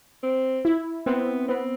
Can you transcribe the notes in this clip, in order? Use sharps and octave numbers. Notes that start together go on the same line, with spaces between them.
C4
E4
B3 C4
B3 C4